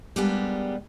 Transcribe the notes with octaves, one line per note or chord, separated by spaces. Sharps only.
G3 G#3 A#3 B3 D4 G4